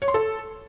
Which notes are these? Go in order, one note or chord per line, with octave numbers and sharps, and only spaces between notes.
C#5
C6
A4